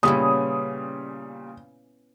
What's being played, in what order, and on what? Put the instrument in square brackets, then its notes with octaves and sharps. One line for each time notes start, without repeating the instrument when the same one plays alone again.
[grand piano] A#2 C#3 G3 [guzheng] B3 C#4 E4 [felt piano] D#6